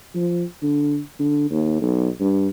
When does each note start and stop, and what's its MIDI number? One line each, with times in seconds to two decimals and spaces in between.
0.15 0.44 53
0.63 0.99 50
1.20 1.50 50
1.51 1.78 39
1.82 2.08 35
2.20 2.48 43